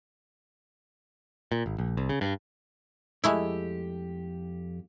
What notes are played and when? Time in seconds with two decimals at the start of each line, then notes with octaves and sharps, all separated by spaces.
1.52 A#2
1.66 G#1
1.78 A#1
1.97 C2
2.09 C#3
2.21 G2
3.24 F2 G#3 A3 E4 G4